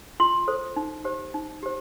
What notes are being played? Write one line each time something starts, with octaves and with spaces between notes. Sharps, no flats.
F4 C6
A4 C5
D#4
G4 C5
D#4
G4 C5